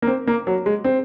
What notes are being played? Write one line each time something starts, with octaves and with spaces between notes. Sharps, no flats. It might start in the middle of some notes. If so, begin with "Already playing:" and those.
A#3
C4
A#3
F#3
G#3
C4